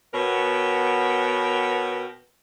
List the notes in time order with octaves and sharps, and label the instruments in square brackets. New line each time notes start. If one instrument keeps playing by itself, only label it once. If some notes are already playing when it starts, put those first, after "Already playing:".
[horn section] B2 B3 A#4 C#5 G5